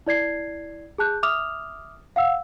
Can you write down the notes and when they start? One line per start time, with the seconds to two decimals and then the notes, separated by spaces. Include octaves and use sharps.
0.07 E4 D5 G#6 C7
0.98 G#4 A5 F#6 G6
1.23 E5 D6 D#6 F6 F7
2.16 F5 F#5 E6